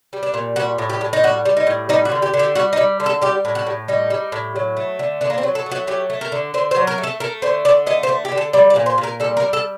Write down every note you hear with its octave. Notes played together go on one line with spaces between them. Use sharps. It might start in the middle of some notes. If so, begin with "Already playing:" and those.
G3
D4
A#2
G3 F#4
A2
G4
A2
D#4
G3 F#4
G3
D#4
A2
G3 D#4
F#4
D3
G4
D3
G4
G3 F#4
D#4
G3
D3
A4
G3 G4
A2
F#4
A2
G3 D#4
G3
A2
F#3
A3
D3
D3 D4
A#3
C4
F#3
A4
A3
F#4
F#3 G4
A3
A#4
D3
D3 C5
C5
F#3
A#4
A3
A4
A3 A#4
D3 C5
D3 D5
A3 D#5
C5
A3
G4
D3
A4
G3 D5
D5
A#2
C5
A#2
A#4
G3 A4
A#4
G3
A4